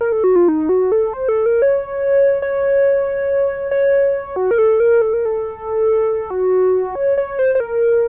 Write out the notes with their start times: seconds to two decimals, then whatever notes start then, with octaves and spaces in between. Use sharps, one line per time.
0.01 A#4
0.12 A4
0.24 F#4
0.36 F4
0.48 D#4
0.69 F#4
0.92 A4
1.13 C5
1.28 A4
1.46 A#4
1.62 C#5
2.42 C#5
3.71 C#5
4.36 F#4
4.51 A#4
4.58 A4
4.80 A#4
5.02 A4
5.13 A#4
5.25 A4
6.30 F#4
6.95 C#5
7.18 C#5
7.39 C5
7.55 C5
7.60 A#4